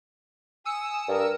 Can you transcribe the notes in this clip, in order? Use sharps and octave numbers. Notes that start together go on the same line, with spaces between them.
G#5 D#6 E6 C#7
G2 A#4